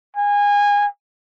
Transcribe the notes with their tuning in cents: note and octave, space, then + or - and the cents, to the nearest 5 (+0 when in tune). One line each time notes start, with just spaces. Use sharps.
G#5 -25